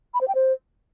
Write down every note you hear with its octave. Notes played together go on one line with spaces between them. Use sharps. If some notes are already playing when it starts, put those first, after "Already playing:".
B5
C5
G5
C5